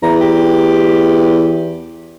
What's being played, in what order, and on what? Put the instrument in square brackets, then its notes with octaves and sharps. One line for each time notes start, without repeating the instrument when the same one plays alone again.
[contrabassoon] E2 [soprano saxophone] A#5
[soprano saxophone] G4